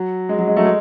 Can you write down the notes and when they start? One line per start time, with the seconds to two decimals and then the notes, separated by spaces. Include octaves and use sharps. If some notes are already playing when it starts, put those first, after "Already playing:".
Already playing: F#3
0.29 G#3
0.39 F#3
0.47 G#3
0.56 F#3 A3
0.65 G#3